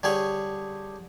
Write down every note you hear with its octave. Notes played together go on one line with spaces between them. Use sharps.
D3 G3 G#4 C#5